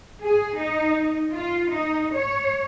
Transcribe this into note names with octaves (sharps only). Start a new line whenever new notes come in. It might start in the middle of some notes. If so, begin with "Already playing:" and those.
G#4
D#4
F4
D#4
C#5